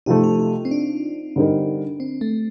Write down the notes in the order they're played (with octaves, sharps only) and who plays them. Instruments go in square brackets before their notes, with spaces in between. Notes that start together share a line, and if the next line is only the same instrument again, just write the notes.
[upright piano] C3 F3 A3 [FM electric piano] D#4
[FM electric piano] F4
F4
C4
D4
[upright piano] D3 G3 C4 D#4 A#4
[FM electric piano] C4
A3